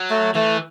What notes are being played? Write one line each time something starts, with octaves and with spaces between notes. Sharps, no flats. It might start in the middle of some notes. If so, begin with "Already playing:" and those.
Already playing: F#3
A3
E3 A3